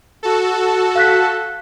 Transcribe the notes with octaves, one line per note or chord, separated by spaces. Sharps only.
F#4 A4
F5 F#6 B6